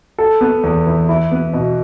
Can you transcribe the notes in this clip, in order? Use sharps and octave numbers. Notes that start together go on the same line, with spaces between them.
A4
B3
E2
E3
E4
B3
B2